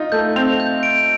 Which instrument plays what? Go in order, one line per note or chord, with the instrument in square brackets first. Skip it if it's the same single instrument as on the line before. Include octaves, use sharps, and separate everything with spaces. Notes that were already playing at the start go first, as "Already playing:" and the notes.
Already playing: [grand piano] D#4 F4
[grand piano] A3 [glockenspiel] G6
[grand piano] C4 [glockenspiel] F7
[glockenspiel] G6
D7